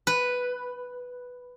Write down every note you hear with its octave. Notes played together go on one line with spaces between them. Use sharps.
B4